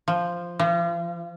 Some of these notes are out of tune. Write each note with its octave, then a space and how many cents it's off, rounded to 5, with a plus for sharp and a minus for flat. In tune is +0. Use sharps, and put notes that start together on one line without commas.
F3 -5
F3 -40